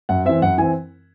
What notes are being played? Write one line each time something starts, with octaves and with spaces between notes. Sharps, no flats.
F#2 F#5
E3 C4 E5
F#2 F#5
E3 C4 G#5